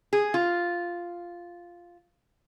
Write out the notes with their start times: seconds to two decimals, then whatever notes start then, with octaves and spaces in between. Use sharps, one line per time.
0.13 G#4
0.34 F4